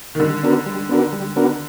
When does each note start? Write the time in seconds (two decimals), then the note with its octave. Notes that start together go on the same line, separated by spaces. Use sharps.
0.15 D#3
0.20 D3 G3
0.43 B3 D4 F#4 A#4
0.66 G3
0.89 B3 D4 F#4 A#4
1.13 G3
1.36 B3 D4 F#4 A#4